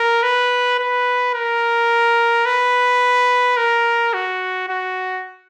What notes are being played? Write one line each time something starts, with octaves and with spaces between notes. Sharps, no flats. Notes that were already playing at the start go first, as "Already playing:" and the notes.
Already playing: A#4
B4
B4
A#4
B4
A#4
F#4
F#4